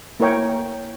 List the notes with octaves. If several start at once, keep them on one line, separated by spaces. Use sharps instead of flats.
A#3 E4 A#4 C#5 G5